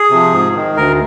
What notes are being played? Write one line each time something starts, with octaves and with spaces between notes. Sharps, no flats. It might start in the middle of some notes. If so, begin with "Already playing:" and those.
Already playing: G#4
C3 F3
G#2
D#3
D2 A#4